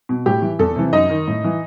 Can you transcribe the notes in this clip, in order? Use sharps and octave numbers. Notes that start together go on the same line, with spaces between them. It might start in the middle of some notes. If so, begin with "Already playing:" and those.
B2
A2 G4
E3
E2 A4
C3 E3
F#2 D#4 D#5
D#3
A2
E3